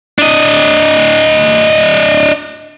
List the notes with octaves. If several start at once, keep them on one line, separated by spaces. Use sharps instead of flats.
D4 D#5